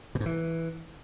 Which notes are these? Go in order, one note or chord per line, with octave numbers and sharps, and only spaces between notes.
B2
G#2
E3